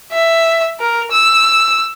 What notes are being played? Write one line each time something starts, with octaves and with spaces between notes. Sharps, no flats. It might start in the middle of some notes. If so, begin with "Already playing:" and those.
E5
A#4
E6